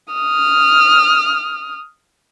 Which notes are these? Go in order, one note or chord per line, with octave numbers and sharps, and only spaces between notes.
D#6 F6